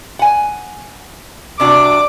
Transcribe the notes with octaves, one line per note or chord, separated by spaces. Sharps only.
F#5 G#5
C3 D4 F#4 D6